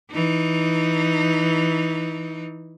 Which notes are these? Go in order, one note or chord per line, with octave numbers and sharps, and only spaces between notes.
E3 D#4